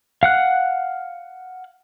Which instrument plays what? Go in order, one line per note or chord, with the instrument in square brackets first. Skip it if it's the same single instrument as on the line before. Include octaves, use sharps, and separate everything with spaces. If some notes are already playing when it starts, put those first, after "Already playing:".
[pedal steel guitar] F5 F#5 F#6